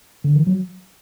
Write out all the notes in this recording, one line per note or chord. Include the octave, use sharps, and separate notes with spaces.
D3
E3
F#3